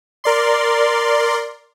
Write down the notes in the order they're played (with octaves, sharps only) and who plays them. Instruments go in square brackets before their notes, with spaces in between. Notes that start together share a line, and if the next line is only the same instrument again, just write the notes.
[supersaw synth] A#4 D5 C6